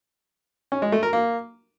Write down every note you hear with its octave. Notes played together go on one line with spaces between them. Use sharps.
C#4
G#3
A3
A#4
A#3